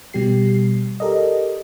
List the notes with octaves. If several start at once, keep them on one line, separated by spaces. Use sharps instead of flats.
B2 G3 G4 C7
G4 A4 A#4 D5 D#5